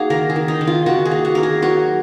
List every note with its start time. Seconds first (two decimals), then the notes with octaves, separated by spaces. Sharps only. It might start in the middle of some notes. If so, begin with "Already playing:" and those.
Already playing: A#3 D#4 F#4 G#4
0.10 D#3 A#4
0.30 G#4
0.36 D#3
0.48 D#4
0.61 D#3
0.67 F4
0.86 D#3 F#4
1.05 G#4
1.11 A#3
1.25 F#4
1.35 D#3 A#4
1.43 G#4
1.62 F#3 F#4